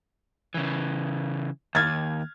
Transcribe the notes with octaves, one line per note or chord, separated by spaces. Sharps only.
C#3 E3
D#2 F6 G#6 A6